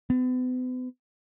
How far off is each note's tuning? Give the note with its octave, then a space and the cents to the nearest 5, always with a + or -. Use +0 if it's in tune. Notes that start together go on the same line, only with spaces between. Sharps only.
B3 +40